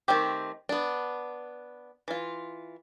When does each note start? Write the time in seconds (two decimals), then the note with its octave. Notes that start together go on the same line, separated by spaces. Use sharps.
0.08 D#3 A3 C4 G4
0.69 B3 D4
2.08 E3 F4